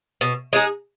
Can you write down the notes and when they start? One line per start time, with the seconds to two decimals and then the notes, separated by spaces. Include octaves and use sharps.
0.21 B2
0.53 G#3 D#4 G#4